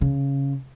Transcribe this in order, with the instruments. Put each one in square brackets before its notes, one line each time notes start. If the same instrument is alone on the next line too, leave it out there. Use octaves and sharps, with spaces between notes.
[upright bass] C#3